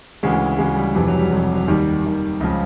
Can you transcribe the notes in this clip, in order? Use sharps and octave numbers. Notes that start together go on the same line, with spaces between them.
D2 C#3 E3 G#3
D2 C#3 E3 G#3
G3
F1 F2 C3 E3
F#3
G3
F1 F2 C3 E3 F#3
F#3
D#2 D#3 G3
D#2 D#3
C#2 C#3 F3